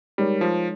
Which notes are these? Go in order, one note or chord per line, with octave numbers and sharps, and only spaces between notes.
G3 G#3 D#4 A#4 C#5
F3